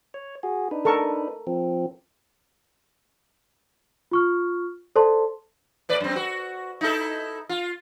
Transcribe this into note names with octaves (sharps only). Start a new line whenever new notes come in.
C#5
F#4 G#4
D4 D#4 B4
A4 A#4 C#6
F3 C4
F4 C#6 F6
A4 C5 D5 A5 C6
A2 B4 D5
F#2 C4
F#4
D#4 E4 A4
F4